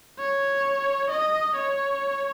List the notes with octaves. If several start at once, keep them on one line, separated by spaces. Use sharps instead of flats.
C#5
D#5
C#5